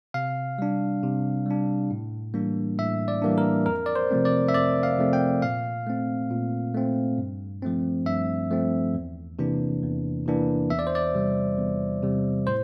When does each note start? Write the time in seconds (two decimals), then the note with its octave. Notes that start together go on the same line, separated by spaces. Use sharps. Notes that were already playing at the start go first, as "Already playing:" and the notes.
0.14 C3 F5
0.58 G3 D4
1.03 C3
1.46 G3 D4
1.90 A2
2.34 E3 G3 A#3 D4
2.78 A2 E5
3.08 D5
3.22 E3 G3 A#3 D4
3.38 A#4
3.66 F2 A#4
3.86 D5
3.96 C5
4.11 C3 F3 A3 C4
4.25 D5
4.48 E5
4.54 F2 D5
4.83 F5
4.98 C3 F3 A3 C4
5.13 G5
5.42 A#2 F5
5.86 A3 C4
6.31 A#2
6.74 A3 C4
7.18 G2
7.62 F3 A3 C4
8.06 G2 E5
8.51 F3 A3 C4
8.94 E2
9.39 C3 E3 A#3 D4
9.83 E2
10.26 C3 E3 A#3 D4
10.70 E2 E5
10.79 D5
10.87 C5
10.95 D5
11.14 C3 G3
11.58 E2
12.03 C3 G3
12.47 A2 C5